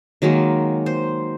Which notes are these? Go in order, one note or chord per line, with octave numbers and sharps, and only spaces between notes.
D#3 F#3 G#3 A#3
C5